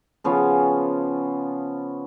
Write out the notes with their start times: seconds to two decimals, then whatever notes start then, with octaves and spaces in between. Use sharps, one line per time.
0.24 C#3 F3 B3 C#4